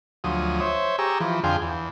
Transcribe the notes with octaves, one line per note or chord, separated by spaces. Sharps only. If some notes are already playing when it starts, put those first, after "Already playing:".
D2 F3 F#3 D#6
C5 C#5 E5
G4 G#4 A#5 C#6 E6
E3 F3
F2 D3 G#4 F5 G5 C6
E2